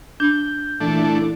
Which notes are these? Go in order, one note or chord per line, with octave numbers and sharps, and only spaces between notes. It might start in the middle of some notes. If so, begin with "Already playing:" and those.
D4 G6
A#2 E3 A3 D4 E4